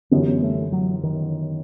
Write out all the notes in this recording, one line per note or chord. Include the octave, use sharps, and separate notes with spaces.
G1 F#2 E3 G3 B3
A3
F#3
D#3